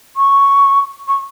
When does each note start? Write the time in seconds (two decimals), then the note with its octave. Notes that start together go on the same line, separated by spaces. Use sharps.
0.17 C#6
1.08 C#6